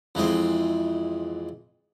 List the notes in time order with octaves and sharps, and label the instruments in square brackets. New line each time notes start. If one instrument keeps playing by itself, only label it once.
[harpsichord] F2 E3 G#3 C4